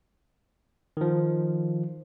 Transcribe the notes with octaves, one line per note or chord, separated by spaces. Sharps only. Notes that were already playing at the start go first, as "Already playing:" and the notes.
D#3 F3